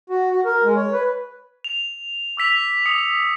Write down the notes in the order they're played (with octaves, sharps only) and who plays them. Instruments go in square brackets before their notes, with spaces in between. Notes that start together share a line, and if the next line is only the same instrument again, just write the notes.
[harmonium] F#4
F#4
A#4
G#3
C#5
B4
[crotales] F7
D6 E6 B6 F7
D#6 C#7